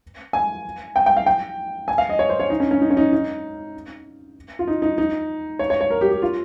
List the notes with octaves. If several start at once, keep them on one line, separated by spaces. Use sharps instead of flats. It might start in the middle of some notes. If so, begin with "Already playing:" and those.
G#5
G5
G5
F5
G5
G#5
F5
D#5
C#5
C5
C#5
D#4
C#4
C#4
D#4
C#4
D#4
D#4
F4
D#4
D#4
D#4
C#5
C#5
C#5
A#4
G4
G4
F4